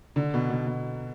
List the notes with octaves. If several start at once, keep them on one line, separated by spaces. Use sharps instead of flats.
D3
B2
B2
B2